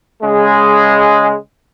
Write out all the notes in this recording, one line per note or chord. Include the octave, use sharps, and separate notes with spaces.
C#3 G#3